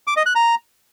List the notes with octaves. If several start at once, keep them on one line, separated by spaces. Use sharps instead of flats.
D6
D#5
F#6
A#5